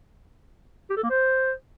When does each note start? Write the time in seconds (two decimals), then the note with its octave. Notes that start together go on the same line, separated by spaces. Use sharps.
0.90 G4
0.97 A4
1.03 A#3
1.10 C5